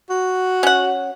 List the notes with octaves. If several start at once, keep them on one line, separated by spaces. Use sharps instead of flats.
F#4
C#4 F#5